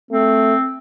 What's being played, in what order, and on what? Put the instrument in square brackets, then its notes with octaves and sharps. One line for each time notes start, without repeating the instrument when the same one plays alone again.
[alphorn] A3 [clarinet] C4